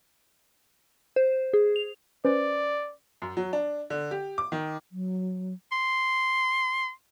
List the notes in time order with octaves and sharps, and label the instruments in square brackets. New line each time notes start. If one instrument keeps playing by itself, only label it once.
[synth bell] C5
G#4
F7
[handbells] C#4 B4 C5 [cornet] D5
[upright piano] F#2
F#3
D4
D3
G4
D6
D#3
[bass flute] F#3
[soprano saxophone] C6